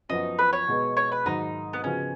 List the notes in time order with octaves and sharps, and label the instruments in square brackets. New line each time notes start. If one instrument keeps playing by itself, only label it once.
[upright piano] F#2 F3 B3 F#4 [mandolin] D#4
[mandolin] B4
C#5
[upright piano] B2 G#3 B3
[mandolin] C#5
B4
[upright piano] G#2 D#3 F#3 [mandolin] D#4
[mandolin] B3
[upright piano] C#3 F3 B3 F#4 [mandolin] C#4